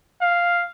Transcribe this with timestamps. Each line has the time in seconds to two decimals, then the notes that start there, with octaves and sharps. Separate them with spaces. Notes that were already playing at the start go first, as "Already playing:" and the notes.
0.22 F5